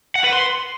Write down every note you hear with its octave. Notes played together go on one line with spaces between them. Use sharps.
F#5
B4
C6